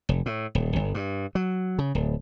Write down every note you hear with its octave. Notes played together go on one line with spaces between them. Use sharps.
F1
A2
D#1
G1
G2
F#3
C#3
D1